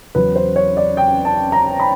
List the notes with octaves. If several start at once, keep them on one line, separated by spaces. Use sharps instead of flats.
E2 C#3 F#3 B4
C5
C#5
D5
G5
A5
A#5
B5